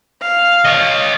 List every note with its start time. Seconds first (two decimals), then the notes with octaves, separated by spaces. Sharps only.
0.22 F5
0.65 C#5 D#5